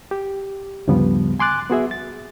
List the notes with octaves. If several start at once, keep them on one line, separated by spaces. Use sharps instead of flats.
G4
D2 G2 C#3 F3 G3 B3
G#5 C6 D6 F#6 A6
B3 F#4 G#4 E5
A6